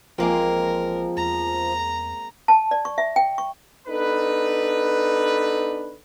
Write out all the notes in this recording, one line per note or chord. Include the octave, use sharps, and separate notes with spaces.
A1 F3 G#3 A#3 C4 A#4
E2 A#5
A5
D5
C#6
E5
G5
C#6
B3 D4 D#4 A4 B4